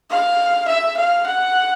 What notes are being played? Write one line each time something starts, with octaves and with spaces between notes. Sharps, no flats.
F5
E5
F5
F#5